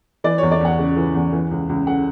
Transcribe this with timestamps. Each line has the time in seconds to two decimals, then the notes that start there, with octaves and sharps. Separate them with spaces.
0.24 E3 D5
0.38 E2 C#5
0.52 D5
0.61 E2 F#5
0.79 C#3
0.97 E3
1.15 E2
1.33 E3
1.51 C#2
1.69 C#2
1.87 C#3 F#5